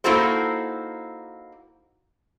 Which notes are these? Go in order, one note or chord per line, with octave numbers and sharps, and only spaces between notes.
A#3 D#4 E4 F#4 A4 C5